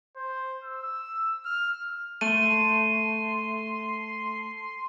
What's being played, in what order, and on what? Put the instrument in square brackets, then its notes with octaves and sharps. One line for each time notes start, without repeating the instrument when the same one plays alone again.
[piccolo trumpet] C5
E6
F6
[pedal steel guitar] A3 [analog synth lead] C6 [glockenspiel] D#7